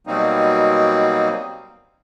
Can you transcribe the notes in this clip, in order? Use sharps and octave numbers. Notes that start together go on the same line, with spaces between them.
B2 F#3 G3 A#3 C4 D#4